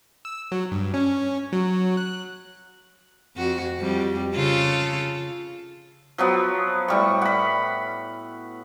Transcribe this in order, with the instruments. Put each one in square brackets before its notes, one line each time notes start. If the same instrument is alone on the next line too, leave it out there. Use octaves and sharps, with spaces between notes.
[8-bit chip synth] E6
F#3
G2
C#4
F#3
F#6
[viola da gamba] F2 F#4
F2 G3
C#3 F4 A4
[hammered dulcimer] F3 F#3 B3
A2 G3 C#6
F#5 B5